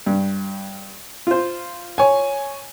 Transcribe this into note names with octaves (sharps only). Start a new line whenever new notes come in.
G2
F4 C5
C#5 G#5